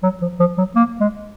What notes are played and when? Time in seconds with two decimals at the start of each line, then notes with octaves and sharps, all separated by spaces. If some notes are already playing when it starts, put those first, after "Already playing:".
0.03 F#3
0.22 F3
0.39 F3
0.58 F#3
0.76 A#3
1.00 G#3